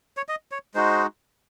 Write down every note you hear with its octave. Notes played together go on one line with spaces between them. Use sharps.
C#5
D#5
C#5
G#3 D#4 F#4 C5